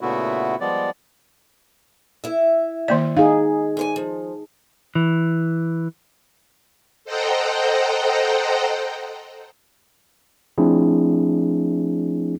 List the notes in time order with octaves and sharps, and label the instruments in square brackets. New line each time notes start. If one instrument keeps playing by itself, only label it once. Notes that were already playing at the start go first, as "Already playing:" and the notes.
[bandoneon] A#2 C#3 A3 B3 E4 F#4
F3 G3 G#3 B3 D5
[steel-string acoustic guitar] E4 E5
[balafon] D#3 A#3 D5
[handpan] D#4 G#4 [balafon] F5
[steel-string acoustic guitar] G#2 C5 G#5
F3
[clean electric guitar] E3
[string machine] A4 C5 D#5 F#5 G5 A#5
[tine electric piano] F3 A3 C4 D4 E4 G#4